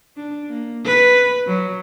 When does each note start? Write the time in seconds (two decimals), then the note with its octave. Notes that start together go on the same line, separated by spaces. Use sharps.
0.17 D4
0.48 A#3
0.85 B4
1.47 F#3